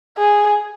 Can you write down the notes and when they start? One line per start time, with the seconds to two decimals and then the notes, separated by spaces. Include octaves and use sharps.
0.17 G#4